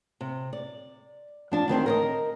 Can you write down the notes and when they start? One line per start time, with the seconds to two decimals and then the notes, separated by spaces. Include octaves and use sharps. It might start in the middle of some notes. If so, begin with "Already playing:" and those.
0.21 C3
0.53 D5
1.52 F3 D4 A5
1.68 D2 D#3 C4 C5
1.86 A#4 C#5 D#5